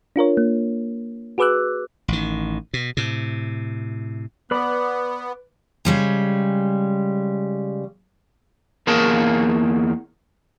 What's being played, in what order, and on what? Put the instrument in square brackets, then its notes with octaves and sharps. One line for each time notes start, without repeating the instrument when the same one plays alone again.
[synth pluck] D4 F4 A#4 C#5
A#3
F#4 G#4 B4 D6 E6 F#6
[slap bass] A1 D#3
B2
A2 C3
[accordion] B3 [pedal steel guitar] B4 D5 B5
[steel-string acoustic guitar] C#3 G3 G#3
[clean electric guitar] E2 A#3 G#4 A#4 C#5 A5